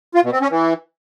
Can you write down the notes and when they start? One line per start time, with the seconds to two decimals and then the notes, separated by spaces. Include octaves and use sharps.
0.15 F4
0.24 B2
0.33 C4
0.41 C#4
0.50 E3